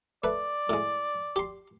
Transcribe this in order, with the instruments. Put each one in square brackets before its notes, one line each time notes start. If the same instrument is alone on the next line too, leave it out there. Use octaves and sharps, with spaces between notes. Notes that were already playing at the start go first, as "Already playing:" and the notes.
[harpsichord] A3 B4 [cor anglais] D5
[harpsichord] A2 G#3
G4 C6